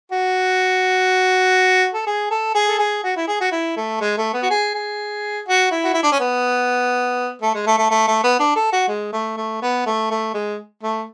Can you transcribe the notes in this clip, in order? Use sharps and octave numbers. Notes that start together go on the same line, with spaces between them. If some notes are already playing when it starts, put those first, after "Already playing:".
F#4
A4
G#4
A4
G#4
A4
G#4
F#4
E4
G#4
F#4
E4
A3
G#3
A3
B3
F#4
G#4
G#4
F#4
E4
F#4
E4
D4
C#4
B3
A3
G#3
A3
A3
A3
A3
B3
D4
A4
F#4
G#3
A3
A3
B3
A3
A3
G#3
A3